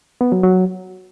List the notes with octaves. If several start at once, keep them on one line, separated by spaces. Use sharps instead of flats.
B3
F#3
F#3